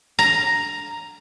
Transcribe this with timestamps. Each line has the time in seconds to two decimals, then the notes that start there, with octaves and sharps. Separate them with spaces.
0.19 A#5